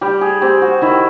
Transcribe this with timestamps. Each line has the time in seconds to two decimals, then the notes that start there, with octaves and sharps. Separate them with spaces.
0.01 G3 G4
0.21 G#4
0.42 C4 G4
0.62 F#4
0.82 D#3 E4